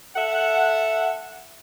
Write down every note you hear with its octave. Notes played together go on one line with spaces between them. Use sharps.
A4 E5 F#5